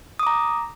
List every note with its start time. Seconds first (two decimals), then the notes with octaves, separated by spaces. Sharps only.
0.19 D#6
0.23 D6
0.27 A#5